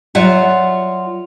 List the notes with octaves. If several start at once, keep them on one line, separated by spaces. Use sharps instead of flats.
F#3 F4 D5 E5 F#5